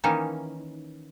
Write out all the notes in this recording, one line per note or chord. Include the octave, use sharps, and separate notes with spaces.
D#3 E3 A#3 C#4 D#4